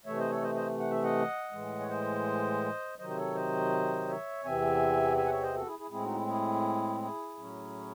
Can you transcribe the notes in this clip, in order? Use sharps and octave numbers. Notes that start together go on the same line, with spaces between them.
C3 E3 A3 C#5 E5
C5 D#5
A4 C#5
C5 D#5
C5 D#5
F#5
E5
D#5 F#5
A2 E3 G#3
C#5
C5 D#5
C3 D#3 F#3 C5 D#5
C5
A4 C#5
C5 D#5
C#5 E5
E2 C3 E3 C4 E5 G#5
E5 G#5
F#5
C#5 E5
C5 D#5
F#4 A4
E4 G#4
E4 G#4
A2 G#3 C4 E4 G#4
D#4 F#4
E4
E4 G#4
E4 G#4
A2 F#3 C#4